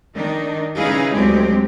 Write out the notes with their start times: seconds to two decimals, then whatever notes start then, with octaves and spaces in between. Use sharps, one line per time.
0.14 D#3 D4 D#4
0.76 C#3 D#4 E4 G#4 B4 F5
1.14 D2 D3 F#3 G#3 C4 G4